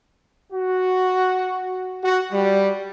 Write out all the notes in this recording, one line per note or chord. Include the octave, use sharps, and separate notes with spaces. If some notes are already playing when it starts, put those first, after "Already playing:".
F#4
F#4
G3